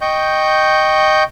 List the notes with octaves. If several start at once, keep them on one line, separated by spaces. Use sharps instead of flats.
D#5 G5 C#6 G6